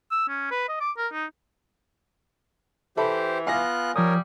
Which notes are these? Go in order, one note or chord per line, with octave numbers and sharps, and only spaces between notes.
E6
C#4
B4
D#5
D6
A#4
D#4
E3 G4 A4 C5 E5 B5
B3 F4 F5 G#5 F#6 A#6
F3 G3 A#4 C#5 D#6